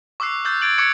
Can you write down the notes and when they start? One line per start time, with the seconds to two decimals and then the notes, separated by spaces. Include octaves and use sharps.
0.20 C#6 D6 E6 F#6 C7
0.45 D6 E6 F#6 G6 A6
0.61 E6 G#6 A6 D7 F#7
0.78 C#6 D6 E6 F#6 G#6 C#7